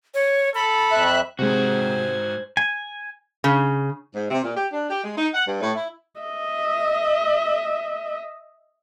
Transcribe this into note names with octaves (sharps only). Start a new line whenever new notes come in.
C#5
A4 B5
F2 E5 F#6
G#2 C3 G#3 F#4 C5 G#5
G#5
C#3
G#2
C3
A#2
G4
D4
G4
G#3
D#4
F#5
G2
A2
E4
D#5 E5